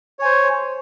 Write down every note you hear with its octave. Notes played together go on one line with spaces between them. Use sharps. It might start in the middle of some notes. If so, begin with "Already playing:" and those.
C5 C#5 G#5